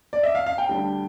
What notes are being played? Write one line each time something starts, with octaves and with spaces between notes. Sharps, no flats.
D5
E5
F5
F5
G5
D2 D3 G3